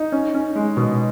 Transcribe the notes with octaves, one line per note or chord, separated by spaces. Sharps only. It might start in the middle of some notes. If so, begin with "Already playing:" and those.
Already playing: D#4
C#4
C#4
G#3
B2